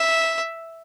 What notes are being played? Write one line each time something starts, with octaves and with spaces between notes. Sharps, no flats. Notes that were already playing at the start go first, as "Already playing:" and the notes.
Already playing: E5